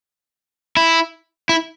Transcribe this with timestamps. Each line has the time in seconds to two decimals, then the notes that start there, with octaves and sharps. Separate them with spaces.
0.77 E4
1.49 E4